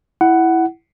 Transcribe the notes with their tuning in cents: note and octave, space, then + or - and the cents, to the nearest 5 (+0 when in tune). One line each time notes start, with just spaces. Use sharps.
E4 +0 F#5 +10